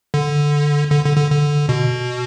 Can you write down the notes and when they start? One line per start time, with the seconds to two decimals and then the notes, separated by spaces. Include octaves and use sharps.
0.14 D3
0.92 D3
1.05 D3
1.17 D3
1.31 D3
1.69 B2